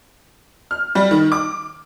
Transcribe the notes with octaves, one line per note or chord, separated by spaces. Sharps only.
F6
G3
D#3
D6